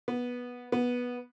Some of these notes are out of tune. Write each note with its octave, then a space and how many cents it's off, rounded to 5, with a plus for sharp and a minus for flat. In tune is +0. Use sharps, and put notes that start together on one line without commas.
B3 -10
B3 -10